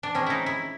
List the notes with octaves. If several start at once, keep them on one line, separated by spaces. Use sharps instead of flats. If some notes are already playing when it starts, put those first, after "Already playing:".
D4
D#3 G#3 C4 C#4
D#4 E4
E4